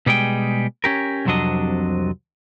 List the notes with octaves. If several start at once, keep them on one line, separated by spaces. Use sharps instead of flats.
B2 G3 G#3 G#4 G5
C#4 G4 A#4
C2 F2 C3 F#3 D4 D#5